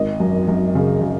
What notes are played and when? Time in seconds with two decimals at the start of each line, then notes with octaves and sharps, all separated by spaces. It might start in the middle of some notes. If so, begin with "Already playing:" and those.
Already playing: G#1 D#5
0.20 F#2
0.48 F#2
0.75 C#3
1.01 C#3